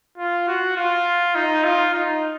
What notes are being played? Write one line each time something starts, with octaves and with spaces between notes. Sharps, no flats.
F4
F#4
F4
D#4
F4
D#4